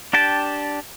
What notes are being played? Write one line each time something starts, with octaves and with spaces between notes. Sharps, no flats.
D4 G4 G5 A5